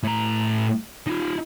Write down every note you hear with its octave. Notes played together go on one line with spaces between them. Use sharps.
A2 A#5
D#4 F4